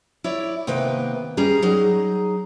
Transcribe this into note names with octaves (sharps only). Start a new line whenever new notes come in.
E4 C#5 D5
C3 D#3 A#3 B3 B4 G5
G3 C#4 G#4 A#5
F#3 D#4 G#4 A#5